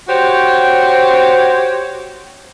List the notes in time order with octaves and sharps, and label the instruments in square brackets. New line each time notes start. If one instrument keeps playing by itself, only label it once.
[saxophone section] F#4 G4 C5 C#5